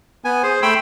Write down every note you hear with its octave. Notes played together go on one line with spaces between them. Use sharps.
B3 G#5
G#4 C5
A3 G5 B5 C6 E6